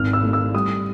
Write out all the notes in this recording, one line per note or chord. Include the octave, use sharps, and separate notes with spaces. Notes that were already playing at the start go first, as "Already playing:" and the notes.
Already playing: G#1 F6
E6
A3
E6
G3 D#6